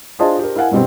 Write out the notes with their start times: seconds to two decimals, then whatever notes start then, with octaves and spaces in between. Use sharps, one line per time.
0.19 D4 F4 G#4 C5 D#5 A5
0.39 G4 A#4
0.56 E4 A#4 F5 F#5 G#5
0.71 G2 B2 G3 C4